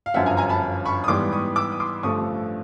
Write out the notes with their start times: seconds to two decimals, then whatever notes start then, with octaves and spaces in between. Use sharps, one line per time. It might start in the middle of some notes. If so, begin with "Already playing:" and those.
0.06 F5
0.14 G1 F#2 D3 F3 E5 F#5
0.26 G#5 A#5
0.37 G#5 A#5
0.49 A5 B5
0.85 B5 C#6
1.04 D#6
1.08 G#2 E3 G3 B3 C6 D6
1.33 C#6 D#6
1.56 D6 E6
1.72 D#6
1.80 C6 D6
2.03 A1 G2 D3 F3 A3 C#6 D#6